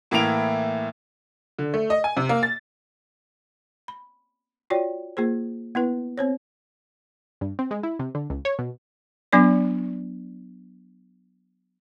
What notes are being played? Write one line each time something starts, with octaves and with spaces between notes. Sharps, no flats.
A2 E3 A#3 E4 D7 F7
D3
A3
D#5
G#5
C3
A#3
A6
B5
F4 F#4 C#5 D5 G5
A#3 F4 G#4 C5
B3 E4 B4
C4 C5 C#5
G2
C4
G#3
E4
C3
D3
C#2
C#5
B2
F#3 B3 D4 D5